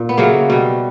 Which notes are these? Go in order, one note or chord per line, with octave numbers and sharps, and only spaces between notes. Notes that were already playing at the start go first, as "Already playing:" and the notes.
Already playing: A#2
B3
C#3 F#3 A3 A#3
B2 G3